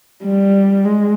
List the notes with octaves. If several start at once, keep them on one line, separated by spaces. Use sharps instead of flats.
G3
G#3